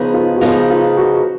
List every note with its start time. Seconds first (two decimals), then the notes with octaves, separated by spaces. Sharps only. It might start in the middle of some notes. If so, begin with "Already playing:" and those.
Already playing: C#3 F3 B3 D#4 G#4
0.14 F4
0.36 F#4
0.41 C#3 F3 B3 D#4 F4 G#4
0.70 F4
0.97 F#4